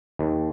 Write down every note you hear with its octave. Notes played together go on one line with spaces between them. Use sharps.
D#2